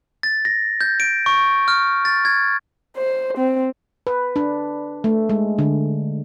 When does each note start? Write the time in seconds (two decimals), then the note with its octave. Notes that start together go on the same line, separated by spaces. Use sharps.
0.23 A6
0.45 A#6
0.81 G6
1.00 D7
1.26 C#6
1.68 F6
2.05 A6
2.25 G#6
2.97 C5
3.37 C4
4.07 B4
4.36 D4
5.04 A3
5.29 G#3
5.59 D3